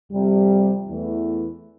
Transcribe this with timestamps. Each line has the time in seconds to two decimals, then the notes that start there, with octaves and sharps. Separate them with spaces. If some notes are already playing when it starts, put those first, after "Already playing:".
0.11 F2 C3 G3
0.87 E2 E3 A3